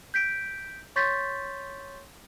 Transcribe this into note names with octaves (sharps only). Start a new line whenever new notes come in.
G6 B6 D7
C#5 C6 C#6 G6 A6 B6